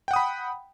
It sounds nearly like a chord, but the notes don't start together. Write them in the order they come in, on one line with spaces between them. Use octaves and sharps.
G5 F#5 D#6 B5